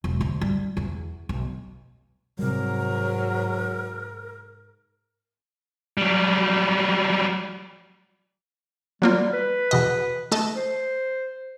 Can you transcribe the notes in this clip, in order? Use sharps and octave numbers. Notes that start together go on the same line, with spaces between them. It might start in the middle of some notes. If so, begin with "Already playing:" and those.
E1
D2
G3
E2
B1
G#2 C3 F#3 G3 A#4
F#3 G3
F#3 G3 A#3 F4
B4
E2 B2 D#5
A3 D#5 A5
C5